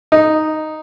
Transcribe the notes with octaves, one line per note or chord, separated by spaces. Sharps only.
D#4